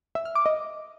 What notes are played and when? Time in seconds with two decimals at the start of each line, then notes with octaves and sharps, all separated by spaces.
0.15 E5
0.25 F6
0.36 D6
0.46 D#5